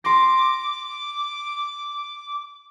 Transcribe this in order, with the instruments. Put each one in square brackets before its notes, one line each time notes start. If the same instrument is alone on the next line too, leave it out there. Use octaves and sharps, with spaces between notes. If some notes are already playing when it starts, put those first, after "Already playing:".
[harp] C6 A#6 [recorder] D6